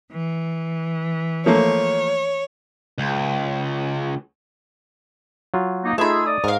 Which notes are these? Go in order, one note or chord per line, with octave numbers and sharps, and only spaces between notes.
E3
F3 A3 A#3 C#5
C#2
F#3 F4
A#3 D#4
A3 D#4 F4 G#4 E5 B5
D5 D#6
G#2 A#4 F5